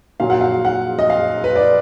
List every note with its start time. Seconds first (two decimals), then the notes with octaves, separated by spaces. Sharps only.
0.20 A#2 F#3 F5
0.30 F#5
0.41 F5
0.65 F#5
0.99 D#5
1.10 F5
1.44 B4
1.55 D5